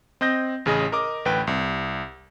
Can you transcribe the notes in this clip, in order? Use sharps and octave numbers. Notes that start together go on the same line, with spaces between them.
C4 D#5 G6 A#6
A1 C#3 G#4 D#5
A#4 D#5 D6
A1 D2 B4 G5
C2